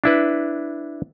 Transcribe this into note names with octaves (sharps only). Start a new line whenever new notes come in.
D4 E4 B4